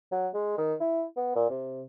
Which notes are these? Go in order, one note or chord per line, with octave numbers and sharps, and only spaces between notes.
F#3
G#3
D#3
E4
B3
A#2
C3